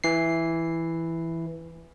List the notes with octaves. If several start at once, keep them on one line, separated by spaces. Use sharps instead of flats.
E3 C7